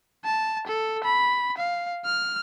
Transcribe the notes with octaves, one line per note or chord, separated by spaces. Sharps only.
A5
A4
B5
F5
F6